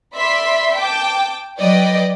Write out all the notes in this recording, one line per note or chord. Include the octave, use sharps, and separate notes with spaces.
D5 E5 B5 C6 B6
G5 A5 D6
F#3 B4 D5 D#5 G5